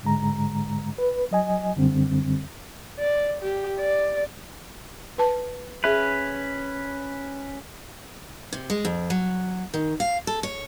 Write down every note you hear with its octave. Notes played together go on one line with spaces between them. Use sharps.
G#2 D3 G#3 A#5
B4
F#3 D#5 G#5
F#2 D3 G3 C4
D5
G4
D5
B4 A5
C#4 G#4 B4 E5
C3
G#3
F2
F#3
D#3
F5
A4
C#5